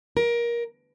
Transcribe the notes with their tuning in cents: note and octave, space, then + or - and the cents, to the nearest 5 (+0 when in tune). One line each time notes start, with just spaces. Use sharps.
A#4 +20